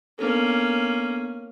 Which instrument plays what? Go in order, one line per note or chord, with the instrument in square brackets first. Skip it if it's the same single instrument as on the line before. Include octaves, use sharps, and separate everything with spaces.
[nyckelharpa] A#3 C#4 [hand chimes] B3 D4 A4